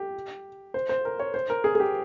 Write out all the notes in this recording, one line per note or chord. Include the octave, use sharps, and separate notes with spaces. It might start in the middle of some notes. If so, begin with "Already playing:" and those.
Already playing: G4
C5
C5
A#4
C#5
C5
A#4
G#4
G#4
G4